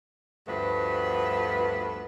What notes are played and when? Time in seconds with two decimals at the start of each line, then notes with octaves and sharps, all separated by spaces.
0.47 D2 G2 F3 A3 B3 B4